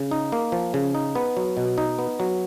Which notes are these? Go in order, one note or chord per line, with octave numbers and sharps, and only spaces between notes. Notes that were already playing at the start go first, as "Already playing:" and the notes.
Already playing: C#3
D#4
A#3
F3
C#3
D#4
B3
F#3
B2
D#4
B3
F#3